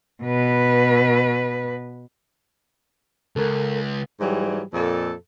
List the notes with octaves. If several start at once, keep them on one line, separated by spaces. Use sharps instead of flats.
B2 B4
C#2 A4 A#4
G#2 E3 F#3 G3
F2 A#2 A4